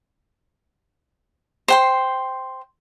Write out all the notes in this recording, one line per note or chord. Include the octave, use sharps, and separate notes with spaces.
C5 G5 C6